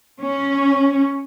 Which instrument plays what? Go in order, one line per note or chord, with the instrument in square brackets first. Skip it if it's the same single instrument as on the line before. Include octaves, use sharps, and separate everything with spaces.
[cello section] C#4